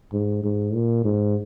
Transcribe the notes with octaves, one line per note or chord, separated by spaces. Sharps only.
G#2
G#2
A#2
G#2